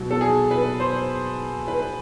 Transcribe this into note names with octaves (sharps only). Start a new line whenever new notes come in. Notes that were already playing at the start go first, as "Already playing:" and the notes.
Already playing: B2 F#3
A4
G#4
B4
C5
B4